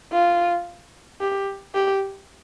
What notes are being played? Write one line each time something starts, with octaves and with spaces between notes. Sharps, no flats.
F4
G4
G4